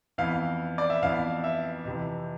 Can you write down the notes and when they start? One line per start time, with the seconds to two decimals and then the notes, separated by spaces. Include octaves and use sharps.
0.18 F2 E3 B3 F5
0.78 D5
0.90 E5
1.02 F2 E3 B3 F5
1.44 E5
1.85 F2 C3 E3